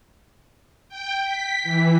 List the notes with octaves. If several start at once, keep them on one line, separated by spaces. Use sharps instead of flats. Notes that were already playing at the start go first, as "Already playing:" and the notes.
G5
B6
E3